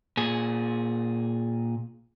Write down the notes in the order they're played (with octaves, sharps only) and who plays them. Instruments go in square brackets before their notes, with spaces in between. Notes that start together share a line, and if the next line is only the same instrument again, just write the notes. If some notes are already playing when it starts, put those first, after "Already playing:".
[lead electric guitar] A#2 G#4